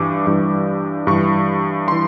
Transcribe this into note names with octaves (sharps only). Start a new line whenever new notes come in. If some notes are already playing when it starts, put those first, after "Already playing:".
Already playing: G2 E3 D6
G2 E3
G2 E3 C#6
E3 C6